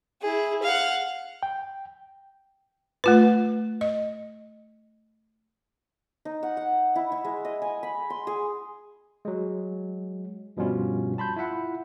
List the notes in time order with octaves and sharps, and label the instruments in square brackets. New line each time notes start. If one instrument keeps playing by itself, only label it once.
[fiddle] E4 G#4
F5 F#5
[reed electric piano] G5
[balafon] A3 F4 B4
D#5
[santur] D#4
F#5
F#5
E4
E4
G#3
D#5
G#5
B5
C6
G#4
[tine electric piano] F#3 G#3
G2 B2 F3 G3 C#4 F4
A5 B5 C6 G6
E4 F4 E5 F#5